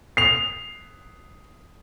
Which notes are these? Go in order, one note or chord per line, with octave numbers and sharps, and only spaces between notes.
C7 F7